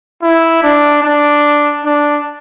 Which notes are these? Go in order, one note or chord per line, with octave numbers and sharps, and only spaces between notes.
E4
D4
D4
D4